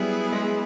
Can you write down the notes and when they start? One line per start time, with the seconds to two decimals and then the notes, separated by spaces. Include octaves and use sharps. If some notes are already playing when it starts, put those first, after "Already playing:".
Already playing: F#3 G3 B3 E4 G#4
0.32 G#3